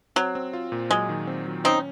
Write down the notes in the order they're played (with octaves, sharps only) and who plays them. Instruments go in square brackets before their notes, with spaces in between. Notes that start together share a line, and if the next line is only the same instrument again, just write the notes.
[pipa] F#3 [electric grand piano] C4
[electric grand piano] C4
F4
A#2
[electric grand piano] F#3 [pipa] G#3
[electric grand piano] D#3
C4
F#3
[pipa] C4 D#4 [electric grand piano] C#4